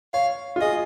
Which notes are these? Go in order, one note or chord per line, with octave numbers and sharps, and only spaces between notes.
C#5 F5
F4
G#4 D#5